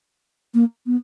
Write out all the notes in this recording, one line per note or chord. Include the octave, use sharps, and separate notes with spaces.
A#3
B3